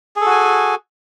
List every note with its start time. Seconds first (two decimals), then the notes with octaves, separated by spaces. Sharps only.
0.16 G#4
0.21 A4
0.26 F#4
0.31 G#5